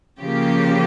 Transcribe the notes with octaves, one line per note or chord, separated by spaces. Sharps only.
C#3 F3 A#3 G4